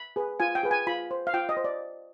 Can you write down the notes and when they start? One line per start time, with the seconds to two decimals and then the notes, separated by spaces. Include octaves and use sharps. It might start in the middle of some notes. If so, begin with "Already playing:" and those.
Already playing: B5
0.16 G#4 B4
0.40 F4 G#5
0.55 G5
0.63 G#4 B4
0.71 G#5
0.87 F4 B5
1.11 C5
1.27 F5
1.34 F4 G5
1.49 D#5
1.57 C5
1.64 D5